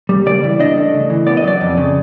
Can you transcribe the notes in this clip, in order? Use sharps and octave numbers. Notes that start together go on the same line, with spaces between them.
G3
C#3 D5
E3
D4 D#5
A3
C#3
E3
B3 D5
D#5
F#3 D5
F2
C#3